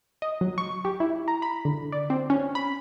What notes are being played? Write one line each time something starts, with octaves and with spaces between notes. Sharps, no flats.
D#5
F#3
C#6
G4
E4
A#5
B5
D3
D5
C4
C#4
B5